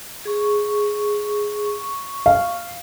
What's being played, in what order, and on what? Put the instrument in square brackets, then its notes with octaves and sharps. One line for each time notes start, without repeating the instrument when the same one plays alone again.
[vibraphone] G#4 C#6
C#6
[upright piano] F5